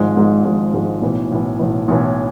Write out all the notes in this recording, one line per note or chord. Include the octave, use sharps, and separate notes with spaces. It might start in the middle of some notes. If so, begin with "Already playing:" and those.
Already playing: G#1 G#2 F3 G#3
G#1 G#2 F3 G#3
G#1 G#2 F3 G#3
G#1 G#2 F3 G#3
B1 A2 E3
B1 A2 E3
B1 A2 E3
B1 A2 E3